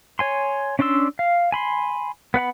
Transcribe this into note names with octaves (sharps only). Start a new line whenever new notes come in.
C#5 G#5 C6
C#4 D4 D5 C6 E6
F5
G#5 B5 C6
B3 B4 F#5 B5